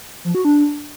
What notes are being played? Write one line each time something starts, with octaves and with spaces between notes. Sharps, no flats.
F3
F#4
D4